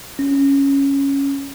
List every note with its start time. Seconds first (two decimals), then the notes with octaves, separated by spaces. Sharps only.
0.19 C#4